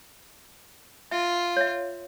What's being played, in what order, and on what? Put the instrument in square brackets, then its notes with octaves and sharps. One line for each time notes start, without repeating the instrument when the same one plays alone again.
[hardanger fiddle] F4 [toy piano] E5
[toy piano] C#5 E5